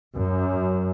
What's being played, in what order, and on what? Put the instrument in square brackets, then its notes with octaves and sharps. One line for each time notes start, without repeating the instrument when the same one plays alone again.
[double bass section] F#2